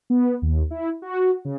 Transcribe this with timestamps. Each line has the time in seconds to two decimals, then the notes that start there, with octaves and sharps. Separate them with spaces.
0.10 B3
0.42 D#2
0.71 E4
1.02 F#4
1.45 C#3